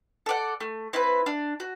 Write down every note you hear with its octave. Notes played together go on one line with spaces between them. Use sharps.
A4 D5 F#5
A3
C4 E4 B4
D4
F#4